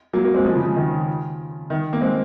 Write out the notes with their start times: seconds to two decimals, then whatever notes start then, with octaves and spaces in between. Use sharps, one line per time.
0.13 F#3 A#3
0.24 F#3 A#3
0.34 G#3 C4
0.45 F3 G#3
0.55 C#3 F3
0.66 C#3
0.76 D#3
1.70 D#3
1.93 A#3
2.01 G#3 C4